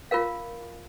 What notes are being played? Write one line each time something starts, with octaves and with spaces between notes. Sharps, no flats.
F4 A#4 F5